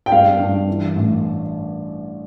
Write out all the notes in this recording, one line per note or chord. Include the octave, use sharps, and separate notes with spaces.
G5
G2 F5
G2
E3
A1